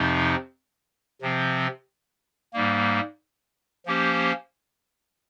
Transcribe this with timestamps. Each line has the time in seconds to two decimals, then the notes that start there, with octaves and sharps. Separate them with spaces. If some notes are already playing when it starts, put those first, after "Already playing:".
Already playing: F2 C3 F3 C4 D#4
1.22 C3 F3 C4
2.53 G#2 G3 A#3
3.86 F3 A#3 C#4 G4 C5